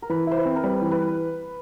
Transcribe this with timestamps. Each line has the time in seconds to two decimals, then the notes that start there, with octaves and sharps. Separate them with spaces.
0.02 A#4
0.09 E3 B4
0.27 E4 C5
0.37 B4
0.45 C4
0.56 A#4
0.64 G3 B4
0.82 E3
0.91 B4